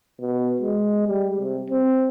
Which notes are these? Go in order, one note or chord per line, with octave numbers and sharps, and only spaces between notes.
B2
G#3
G3
C3
C4